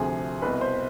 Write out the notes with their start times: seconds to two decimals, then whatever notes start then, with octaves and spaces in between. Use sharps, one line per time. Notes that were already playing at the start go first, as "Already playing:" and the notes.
Already playing: D2 C3 F3 G#4
0.42 C2 B2 B4
0.61 C5